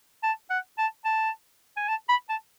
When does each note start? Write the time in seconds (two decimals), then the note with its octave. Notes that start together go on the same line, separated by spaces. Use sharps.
0.23 A5
0.50 F#5
0.78 A5
1.05 A5
1.77 G#5
1.88 A5
2.09 B5
2.29 A5